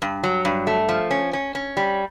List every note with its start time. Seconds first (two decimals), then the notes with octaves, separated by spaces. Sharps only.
0.02 G2
0.24 F#3
0.45 G2
0.67 A3
0.89 F3
1.11 C#4
1.33 C#4
1.55 C#4
1.77 G3